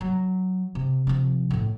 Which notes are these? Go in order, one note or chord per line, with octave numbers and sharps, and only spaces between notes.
F#3
C3
C3 F3
F#2 A2